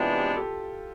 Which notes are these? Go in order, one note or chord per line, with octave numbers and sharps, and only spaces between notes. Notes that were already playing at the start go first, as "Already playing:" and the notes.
Already playing: C3 E3 G#3 B3 D4 F4 G4
G4 A4